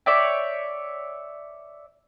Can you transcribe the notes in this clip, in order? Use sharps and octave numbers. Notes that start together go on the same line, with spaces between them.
C#5 D5 E5 G5